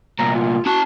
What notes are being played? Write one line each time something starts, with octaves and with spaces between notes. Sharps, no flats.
C2 A#2 A#5
F4
C#4 F#4 A5